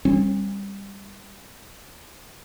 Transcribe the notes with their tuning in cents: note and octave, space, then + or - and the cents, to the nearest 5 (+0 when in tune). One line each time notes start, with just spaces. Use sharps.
G3 +20 C4 +45